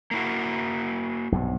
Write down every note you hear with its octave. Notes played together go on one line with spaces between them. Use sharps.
A#3 E4 F#4
B1 G2 C3